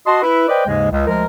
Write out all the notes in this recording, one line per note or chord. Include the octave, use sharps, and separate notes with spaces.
F#4 D#5 A5 C6
E4 B4
B4 C5 D5 D#5 G5
D#2 G#2 C#3 G#3
C#2
D2 F3 G#3 A#4